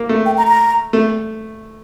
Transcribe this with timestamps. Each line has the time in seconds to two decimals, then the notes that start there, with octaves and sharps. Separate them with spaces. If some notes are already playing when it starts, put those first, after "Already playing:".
Already playing: A#3
0.09 A3
0.26 G5
0.38 A#5
0.48 A#5
0.93 A3